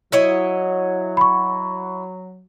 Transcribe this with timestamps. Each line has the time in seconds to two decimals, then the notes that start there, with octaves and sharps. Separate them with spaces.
0.12 F#3 E4 C#5 D#5
1.17 B5 C#6